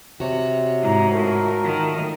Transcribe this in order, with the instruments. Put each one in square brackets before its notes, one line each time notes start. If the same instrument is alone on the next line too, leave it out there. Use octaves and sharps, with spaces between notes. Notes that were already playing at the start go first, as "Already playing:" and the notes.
[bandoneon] C3 [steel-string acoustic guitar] F#4 C#5
[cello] G#2 [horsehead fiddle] E4 A#5
[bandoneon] A3 [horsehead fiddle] F4 A#4
[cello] D#3